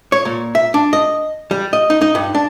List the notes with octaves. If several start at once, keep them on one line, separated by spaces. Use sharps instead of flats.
C#5
A#2
E5
D4
D#5
G3
D#5
D#4
D#4
G2
D4